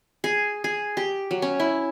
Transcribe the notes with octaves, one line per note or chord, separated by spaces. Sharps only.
G#4
G#4
G4
F#3
C#4
E4